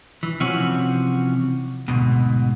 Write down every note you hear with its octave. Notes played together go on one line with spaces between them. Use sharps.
E3
C3 E3 F3 C4 C#4 F#4
D2 G#2 B2